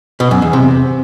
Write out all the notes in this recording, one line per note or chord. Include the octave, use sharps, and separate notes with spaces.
B2
F#2
E2
C3